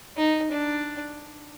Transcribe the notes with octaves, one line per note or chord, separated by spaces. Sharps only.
D#4
D4